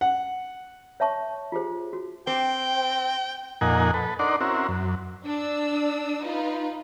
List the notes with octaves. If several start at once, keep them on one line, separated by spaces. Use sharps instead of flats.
F#5
C#5 E5 A5 C#6
F4 G4 G#4 C5
F#4
C4 G5
F2 A#2 D#4 A#4 F#5 G#5
A4 B4
D4 D#4 A#4 D5 F#5 C6
C4 C#4 E4 F#4 A#4
F#2
D4 E6
D#4 F4 B4